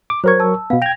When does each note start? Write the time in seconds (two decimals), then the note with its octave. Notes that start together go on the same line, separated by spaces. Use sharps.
0.10 D6
0.24 F#3 A#4 C5 C#6 G#6
0.40 A5 E6
0.70 B2 B3 F5
0.82 G5 G#6 A#6 F7